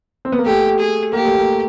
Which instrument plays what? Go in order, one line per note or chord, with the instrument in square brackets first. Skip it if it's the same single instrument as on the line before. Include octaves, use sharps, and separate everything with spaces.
[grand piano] C4
B3
A#3
[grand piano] A3 [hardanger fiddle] G4
[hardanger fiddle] G#4
[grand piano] A#3 [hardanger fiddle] G4
[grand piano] A3
A#3